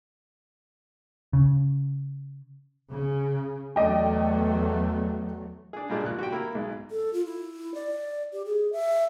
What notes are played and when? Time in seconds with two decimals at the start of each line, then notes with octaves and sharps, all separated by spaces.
1.33 C#3
2.89 C#3
3.76 E2 F#3 A3 D5 D#5 G5
5.73 D4 G#4
5.89 G2 A#2 G#3 D4 G4
6.04 A#1 F4 F#6
6.19 F#4 G4 G5
6.32 A#3 E4 B5
6.55 B1 G#2 G#3
6.91 A4
7.13 F4
7.26 E4
7.74 D5
8.33 G4
8.46 G#4
8.72 E5